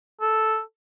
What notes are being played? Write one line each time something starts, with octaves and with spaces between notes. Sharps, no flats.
A4